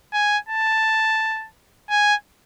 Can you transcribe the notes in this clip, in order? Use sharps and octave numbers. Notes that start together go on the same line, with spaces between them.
G#5
A5
G#5